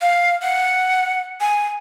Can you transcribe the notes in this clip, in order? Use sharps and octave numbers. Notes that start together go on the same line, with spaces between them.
F5
F#5
G#5